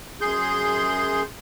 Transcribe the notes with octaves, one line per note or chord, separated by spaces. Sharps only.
F#2 G#4 C6 G6